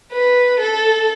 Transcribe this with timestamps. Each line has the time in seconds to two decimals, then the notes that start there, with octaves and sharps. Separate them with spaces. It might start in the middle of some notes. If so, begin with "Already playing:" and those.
0.12 B4
0.60 A4